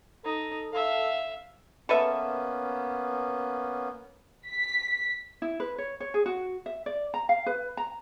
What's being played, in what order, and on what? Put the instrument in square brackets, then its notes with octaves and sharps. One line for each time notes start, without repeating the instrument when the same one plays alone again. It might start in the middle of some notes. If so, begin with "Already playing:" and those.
[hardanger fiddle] D#4 [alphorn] A4
[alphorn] A4 [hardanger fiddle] E5 F5
[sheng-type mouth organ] A#3 B3 C#4 [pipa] A4 B4 E5
[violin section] B6
[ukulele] E4
B4
C#5
C#5
G#4
F#4
E5
D5
A#5
F5
B4
A#5